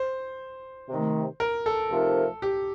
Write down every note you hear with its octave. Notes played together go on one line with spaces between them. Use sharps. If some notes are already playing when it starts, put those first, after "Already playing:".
Already playing: C5
C3 D#3 A3
A#4
A4
C3 F3 A3 D#4 A#4
G4